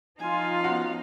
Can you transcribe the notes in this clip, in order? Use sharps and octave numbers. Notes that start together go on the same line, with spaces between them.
F3 D#4 F4 F5 G#5
B3 C#4 F#4